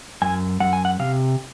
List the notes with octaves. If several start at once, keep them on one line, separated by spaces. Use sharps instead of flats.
F#2 G#5
F#2 F#5
G#5
F#5
C3 F5